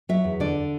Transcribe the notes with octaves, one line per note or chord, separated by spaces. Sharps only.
F#3 E5
E2
D3 D5